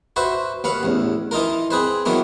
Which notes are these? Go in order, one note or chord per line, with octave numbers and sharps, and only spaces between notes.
F#4 B4 C5 E5
D#2 B4 F5 F#5
A1 E2
E3 D#4 F4 A#4
C4 G#4 B4 C5
D#3 E3 F#3 A#3 B3